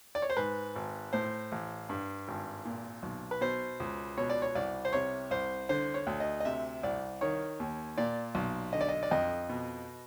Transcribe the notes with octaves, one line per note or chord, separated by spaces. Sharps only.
D5
C#5
C5
G#2 B4
G#1
A2 C5
A1
G2
G#1
A#2
B1
B4
B2 C5
C#2
B2 C#5
D5
C#5
C2 D5
C5
C3 C#5
C2 C5
D3 C5
C#5
D2
D#5
D#5
C3 E5
C2 D5
D#3 C#5
D#2
A#2 D5
B1
D3 D#5
D5
D#5
D5
F2 D#5
B2